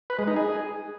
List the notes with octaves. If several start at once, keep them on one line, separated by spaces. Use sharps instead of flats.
B4
G#3
D#4
G#4